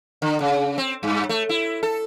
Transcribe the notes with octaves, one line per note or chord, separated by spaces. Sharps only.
D3
C#3
C4
G2
A3
E4
A4